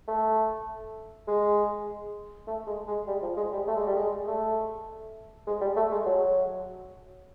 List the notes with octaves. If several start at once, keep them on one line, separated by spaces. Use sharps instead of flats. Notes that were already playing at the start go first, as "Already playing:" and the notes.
A3
G#3
A3
G#3
G#3
G3
F3
G#3
G3
A3
G#3
G3
G#3
A3
G#3
G3
A3
G#3
F#3